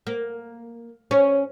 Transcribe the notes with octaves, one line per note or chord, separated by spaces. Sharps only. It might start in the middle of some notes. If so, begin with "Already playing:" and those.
A#3
C#4